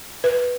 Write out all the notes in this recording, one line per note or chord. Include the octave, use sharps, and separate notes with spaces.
B4